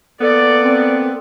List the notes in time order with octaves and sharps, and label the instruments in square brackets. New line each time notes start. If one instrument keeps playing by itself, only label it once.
[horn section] A#3 B3 [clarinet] A4 [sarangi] D5
[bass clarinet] C4